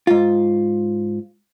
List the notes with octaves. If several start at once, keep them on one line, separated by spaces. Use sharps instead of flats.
G#2 F4